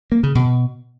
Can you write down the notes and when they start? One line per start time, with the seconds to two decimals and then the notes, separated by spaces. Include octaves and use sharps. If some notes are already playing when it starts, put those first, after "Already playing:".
0.12 A#3
0.23 C#3
0.35 B2